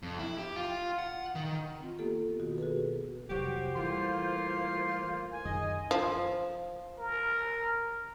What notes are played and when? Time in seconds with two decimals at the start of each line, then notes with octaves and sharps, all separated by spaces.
0.03 F2
0.19 E4
0.38 G4
0.56 F4
0.99 F#5
1.35 D#3
1.80 C4 F4
1.99 A#3 B3 F4 G4 A4
2.40 B2 D#3 F#4
2.58 F#4 G#4 A4 B4
3.30 F1 C2 F#3 F#4 G4 C5
3.76 E3 G3 A3 A#3 F4 C6
5.32 G#5
5.45 F#2 D#3 G#3 D#5
5.91 F3
6.99 A#4